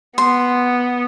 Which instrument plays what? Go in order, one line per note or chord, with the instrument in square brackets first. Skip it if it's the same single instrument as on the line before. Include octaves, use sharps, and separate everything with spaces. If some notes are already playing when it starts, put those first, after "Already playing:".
[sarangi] B3 [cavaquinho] C6